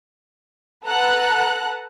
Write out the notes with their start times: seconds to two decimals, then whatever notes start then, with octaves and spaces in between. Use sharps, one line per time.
0.86 A4 B4 F#5 A5 A#5 F#6